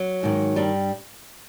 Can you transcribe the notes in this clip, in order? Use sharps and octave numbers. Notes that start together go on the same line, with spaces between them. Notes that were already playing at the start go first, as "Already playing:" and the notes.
Already playing: F#3
G#2 D#3
G2 G3